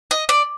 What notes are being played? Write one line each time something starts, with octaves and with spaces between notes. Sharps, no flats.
D#5
D5